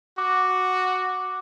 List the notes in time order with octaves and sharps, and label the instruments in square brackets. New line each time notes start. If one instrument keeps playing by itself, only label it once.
[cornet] F#4 [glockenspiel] D6